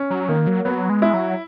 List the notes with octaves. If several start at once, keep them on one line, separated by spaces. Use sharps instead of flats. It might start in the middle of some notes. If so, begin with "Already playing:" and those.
Already playing: C#4
F#3
D#3 A#3
F#3
F#3 B3
G#3
E4
F#3